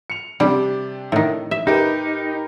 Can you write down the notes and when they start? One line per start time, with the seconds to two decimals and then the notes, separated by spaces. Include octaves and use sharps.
0.10 C#7 F7
0.40 C3 G3 D4 G4
1.12 A2 D#3
1.51 E5
1.67 D#4 G4 A#4 B4